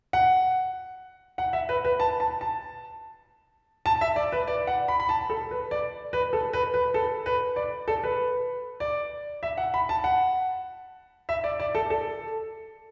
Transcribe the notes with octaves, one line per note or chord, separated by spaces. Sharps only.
F#5
F#5
E5
B4
B4
A5
A5
A5
A5
E5
D5
B4
D5
F#5
B5
B5
A5
A4
B4
D5
B4
A4
B4
B4
A4
B4
D5
A4
B4
D5
E5
F#5
B5
A5
F#5
E5
D5
D5
A4
A4